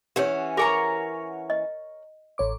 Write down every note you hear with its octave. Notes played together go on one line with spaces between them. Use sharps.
E3 C#4 G4 C#5 F#5
G4 G#4 A#4 C#5 G#5 A#5
D#5
A1 C#5 D6